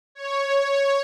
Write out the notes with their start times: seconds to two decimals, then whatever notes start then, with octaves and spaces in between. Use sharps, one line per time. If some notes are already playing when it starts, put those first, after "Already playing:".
0.15 C#5